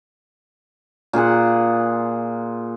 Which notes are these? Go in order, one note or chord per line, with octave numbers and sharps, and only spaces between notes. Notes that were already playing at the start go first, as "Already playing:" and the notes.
A#2 F4 G#4 F#5